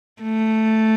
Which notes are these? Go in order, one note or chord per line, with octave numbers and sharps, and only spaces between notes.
A3